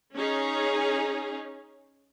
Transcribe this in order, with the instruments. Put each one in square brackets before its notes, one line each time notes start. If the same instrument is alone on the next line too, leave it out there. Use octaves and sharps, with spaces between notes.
[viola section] C#4 D#4 G#4